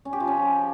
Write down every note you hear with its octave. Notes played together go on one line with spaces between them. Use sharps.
C#4
G4
F3
C#4